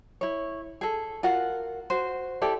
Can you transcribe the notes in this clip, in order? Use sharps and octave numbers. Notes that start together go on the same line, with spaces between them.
E4 C#5
G#4 A4
F4 F#4 A#4 F#5
F#4 C5
E4 G4 A4 D5